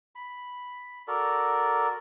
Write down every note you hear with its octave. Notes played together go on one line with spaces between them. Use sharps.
B5
F#4 A4 A#4 D5